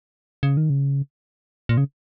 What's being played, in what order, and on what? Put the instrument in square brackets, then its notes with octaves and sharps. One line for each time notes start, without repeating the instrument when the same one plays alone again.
[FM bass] C#3
D#3
C#3
A#2
C#3